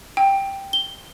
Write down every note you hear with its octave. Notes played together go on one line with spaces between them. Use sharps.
G5
G7